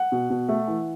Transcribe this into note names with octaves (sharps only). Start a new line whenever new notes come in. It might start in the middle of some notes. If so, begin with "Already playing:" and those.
Already playing: F#5
B2
B2
A3
E3